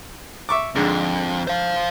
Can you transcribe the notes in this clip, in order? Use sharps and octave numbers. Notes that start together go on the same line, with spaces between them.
E5 C#6 D6
F2 G#2 D3
C5 F5